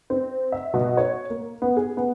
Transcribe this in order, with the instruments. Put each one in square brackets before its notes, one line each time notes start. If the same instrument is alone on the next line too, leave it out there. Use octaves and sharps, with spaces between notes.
[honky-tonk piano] C4
E5
B2
C#5
A#3
B3
G#4
B3